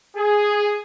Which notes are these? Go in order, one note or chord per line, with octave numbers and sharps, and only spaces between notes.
G#4